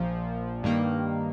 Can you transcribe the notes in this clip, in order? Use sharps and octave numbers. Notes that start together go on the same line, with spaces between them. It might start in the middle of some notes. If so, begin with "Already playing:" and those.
Already playing: A#1 A#2 F3
G2 D#3 A#3